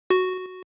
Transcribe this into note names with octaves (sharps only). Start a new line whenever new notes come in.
F#4